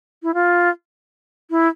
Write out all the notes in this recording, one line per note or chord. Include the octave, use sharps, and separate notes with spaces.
E4
F4
E4